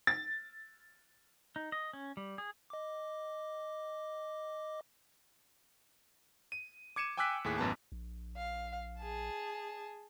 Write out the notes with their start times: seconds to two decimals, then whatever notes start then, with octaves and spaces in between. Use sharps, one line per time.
0.07 A6
1.56 D#4
1.72 D#5
1.93 C#4
2.17 G3
2.38 G#4
2.70 D#5 D6
6.52 D#7
6.96 D6 G#6 C#7 D#7 E7
7.17 G5 G#5 D6 E6 F#6 B6
7.44 D#2 A2 G#4 B6
7.58 A1 F#2 B3 A5
7.92 A#1
8.37 F5
9.00 G#4 A5